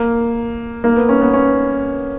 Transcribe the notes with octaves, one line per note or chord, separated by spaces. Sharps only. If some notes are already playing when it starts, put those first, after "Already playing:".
Already playing: A#3
A#3
B3
C#4
B3
C#4